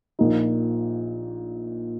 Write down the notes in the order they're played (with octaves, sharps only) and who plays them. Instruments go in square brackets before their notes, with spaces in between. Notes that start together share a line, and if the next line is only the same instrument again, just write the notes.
[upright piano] A#1 A#2 A#3 D#4